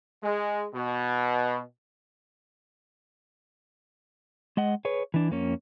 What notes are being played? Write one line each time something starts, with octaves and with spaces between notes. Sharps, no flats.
G#3
B2
G#3 D#5 F#5
G#4 B4 C#5
E3 D4
F2 A#3 C#4